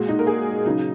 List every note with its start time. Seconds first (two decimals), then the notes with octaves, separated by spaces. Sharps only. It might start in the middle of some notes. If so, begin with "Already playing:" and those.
Already playing: A#2 G#3 F#4
0.08 D#4
0.19 A#4
0.27 G#4
0.66 C#3 F#3 D#4